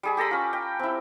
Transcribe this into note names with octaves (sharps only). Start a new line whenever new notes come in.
G3 G#4 B5
G4 A4 A#5 B5
C#4 F4
G5
C4 E4